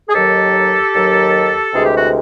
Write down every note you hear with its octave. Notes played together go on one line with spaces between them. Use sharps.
G#4
D#2 D#3 F#3 G4 A4
D#2 D#3 F#3
D2 C3 E3 G#3 G#4
G4
F#4